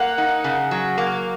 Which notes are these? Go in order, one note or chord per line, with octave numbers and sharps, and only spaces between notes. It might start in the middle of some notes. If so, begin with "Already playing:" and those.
Already playing: A#3 F#5
D#4
C#3
F#3
A#3